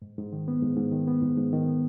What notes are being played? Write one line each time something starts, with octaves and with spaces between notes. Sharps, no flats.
G#2
G#2
D#3
B3
G#2
G#2
D#3
B3
G#2
G#2
D#3
B3